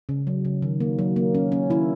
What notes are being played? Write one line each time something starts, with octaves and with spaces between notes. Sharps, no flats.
C#3
F#3
C#3
D#3
A#3
F#3
A#3
C#4
C#4
D#3 E4